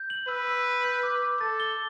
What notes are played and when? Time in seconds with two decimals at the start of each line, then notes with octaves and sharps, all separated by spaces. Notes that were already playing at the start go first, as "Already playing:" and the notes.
Already playing: G6
0.10 F#7
0.28 B4 E6
0.47 E6
0.66 G6
0.85 G6
1.03 D6
1.22 D6
1.40 A4 A6
1.60 G7